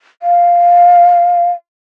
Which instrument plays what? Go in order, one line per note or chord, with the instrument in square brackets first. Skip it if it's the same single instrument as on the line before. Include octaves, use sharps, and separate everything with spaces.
[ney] F5